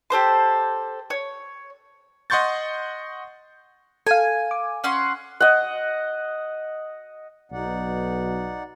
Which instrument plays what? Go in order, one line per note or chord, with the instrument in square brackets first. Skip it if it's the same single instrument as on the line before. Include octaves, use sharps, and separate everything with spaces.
[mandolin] G4 A4 C5 C6
C#5
[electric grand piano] D#5 F#5 C6 C#6 G6 A6
[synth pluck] A4 F5 [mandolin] G#5
[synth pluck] D6
[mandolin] C#4 F#5 C6
[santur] D#5 F#5
[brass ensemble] B1 B2 [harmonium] D#4 D5 F#5